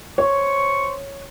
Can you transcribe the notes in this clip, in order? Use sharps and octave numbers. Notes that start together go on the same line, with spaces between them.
C5 C#5 C#6